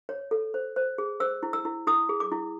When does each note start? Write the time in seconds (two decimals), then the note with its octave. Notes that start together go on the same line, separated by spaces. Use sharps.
0.09 C#5
0.31 A4
0.54 C5
0.76 C5
0.98 G#4
1.20 C5 E6
1.43 E4
1.53 E6
1.65 E4
1.87 E4 D#6
2.09 G#4
2.20 D6
2.32 E4